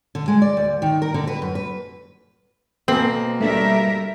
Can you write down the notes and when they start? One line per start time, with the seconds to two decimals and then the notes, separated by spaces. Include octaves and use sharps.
0.15 D3
0.28 G#3
0.42 D5
0.57 D2
0.82 D#3
1.02 A#4
1.14 D3
1.27 B4
1.42 F#2
1.55 B4
2.88 B2 A#3 C4 A4 G#5 F#7
3.40 G3 A3 D4 A#4 E5